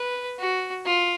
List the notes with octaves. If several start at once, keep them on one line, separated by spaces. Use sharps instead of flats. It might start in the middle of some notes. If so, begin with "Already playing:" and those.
Already playing: B4
F#4
F4